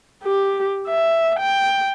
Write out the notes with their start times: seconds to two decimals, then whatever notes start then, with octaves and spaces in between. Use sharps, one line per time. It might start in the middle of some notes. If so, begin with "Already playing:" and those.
0.24 G4
0.88 E5
1.40 G5